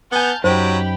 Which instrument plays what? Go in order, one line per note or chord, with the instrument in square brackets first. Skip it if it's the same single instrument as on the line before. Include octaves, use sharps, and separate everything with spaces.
[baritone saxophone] B3 [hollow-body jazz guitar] F#5 G#5 [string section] A5 F6 G6
[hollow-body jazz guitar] F#2 D#4 [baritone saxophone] F#3 [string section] G4 G5 B5 [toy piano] C5